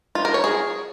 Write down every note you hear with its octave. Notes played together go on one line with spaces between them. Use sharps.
F4
A#4
C#5
G#4